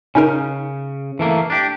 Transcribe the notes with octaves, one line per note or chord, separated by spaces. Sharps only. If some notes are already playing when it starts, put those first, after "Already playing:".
C#3 C#4 D#4 A#4
E3 A3 A#3
D4 G4